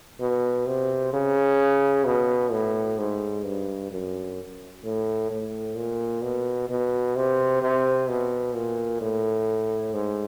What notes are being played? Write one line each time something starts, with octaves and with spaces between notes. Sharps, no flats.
B2
C3
C#3
B2
A2
G#2
G2
F#2
A2
A2
A#2
B2
B2
C3
C3
B2
A#2
A2
G#2